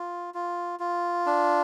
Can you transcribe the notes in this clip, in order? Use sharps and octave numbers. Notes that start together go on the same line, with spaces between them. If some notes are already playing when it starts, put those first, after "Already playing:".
Already playing: F4
F4
F4
D4